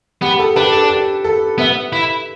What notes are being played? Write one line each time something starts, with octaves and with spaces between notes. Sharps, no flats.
B3 G4
A4
D4 G4 B4
A4
G4
A4
B3 B4 E5
E4